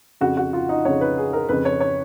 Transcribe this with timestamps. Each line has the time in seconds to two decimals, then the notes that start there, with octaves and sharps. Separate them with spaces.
0.21 F2 C#3 F#4
0.37 F#4
0.53 F4
0.69 D#4
0.85 F2 C#3 C#5
1.01 B4
1.18 G#4
1.33 A#4
1.49 F2 C#3 B4
1.65 C#5
1.81 C#5